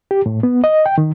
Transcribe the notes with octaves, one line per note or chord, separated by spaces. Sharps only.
G4
A2
B3
D#5
G5
D#3